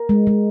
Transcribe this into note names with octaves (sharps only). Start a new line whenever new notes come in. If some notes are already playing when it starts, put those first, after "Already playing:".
Already playing: A#4
G#3
G#3